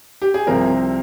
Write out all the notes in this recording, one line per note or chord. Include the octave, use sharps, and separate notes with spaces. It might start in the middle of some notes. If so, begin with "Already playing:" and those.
G4
G#4
C2 C3 F3 C4 A#4